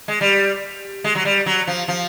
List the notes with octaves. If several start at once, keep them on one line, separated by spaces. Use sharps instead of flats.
G#3
G3
G#3
F#3
G3
F#3
F3
F3